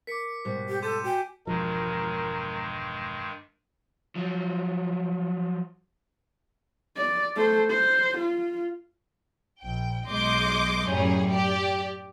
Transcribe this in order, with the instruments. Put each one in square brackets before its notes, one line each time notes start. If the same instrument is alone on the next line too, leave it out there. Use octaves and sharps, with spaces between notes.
[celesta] A#4 D6 [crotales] B6 C#7
[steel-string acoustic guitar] G#2 B2 G3
[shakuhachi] G4
[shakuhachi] A4 [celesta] C6 [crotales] D6 G6 D#7
[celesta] F#4 G#5 [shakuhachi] G5
[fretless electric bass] E1 F3 [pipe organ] G2 D#3 G#3 [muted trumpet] A#4
[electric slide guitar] F3 F#3
[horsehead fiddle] D5
A3 C5
C5
F4
[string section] A#1 G5
B1 G#3 D#5 C6 D6 G6
F#2 A2 G3 C#4 G#4
G4 D5